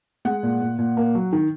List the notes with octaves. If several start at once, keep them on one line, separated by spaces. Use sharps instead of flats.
G#3 F#5
A#2
A#2
A#2
A#3
F#3
D#3